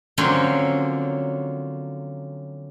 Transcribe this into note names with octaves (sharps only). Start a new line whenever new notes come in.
D3 F3 F#3 A#3 C4 C#4